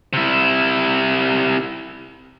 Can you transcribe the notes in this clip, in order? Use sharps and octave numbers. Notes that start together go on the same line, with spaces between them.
C3 E4